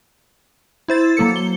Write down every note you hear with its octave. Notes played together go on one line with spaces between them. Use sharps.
E4 C5 A6
F#3 A#3 A4 C#7
G7